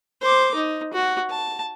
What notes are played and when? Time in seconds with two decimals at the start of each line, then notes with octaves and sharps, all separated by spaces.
0.21 C5 D6
0.55 D#4
0.93 F#4
1.30 A5